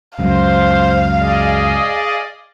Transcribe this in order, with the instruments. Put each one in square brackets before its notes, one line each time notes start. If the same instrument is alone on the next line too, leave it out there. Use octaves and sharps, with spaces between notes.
[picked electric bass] C#2 F#2 [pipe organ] C5 [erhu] F5
[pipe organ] G#4 D5 D#5